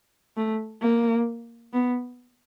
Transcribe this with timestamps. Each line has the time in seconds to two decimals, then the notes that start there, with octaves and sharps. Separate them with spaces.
0.37 A3
0.82 A#3
1.73 B3